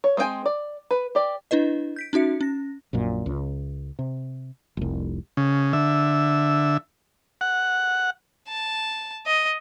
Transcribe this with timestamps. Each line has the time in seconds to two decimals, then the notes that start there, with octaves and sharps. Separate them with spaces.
0.04 C#5
0.17 G#3 C4 E4 G5 G#5
0.46 D5
0.91 B4
1.15 G4 D5
1.51 D4 E4 B4 D#5
1.96 G6 B6 D7
2.13 C#4 D#4 F#4 E5 C#7
2.41 C#4 A#6
2.93 A#1 F#2 A#2
3.26 C#2
3.99 C3
4.77 F1 C2
5.37 C#3
5.73 D3 E5
7.41 F#5
8.48 A5
9.26 D#5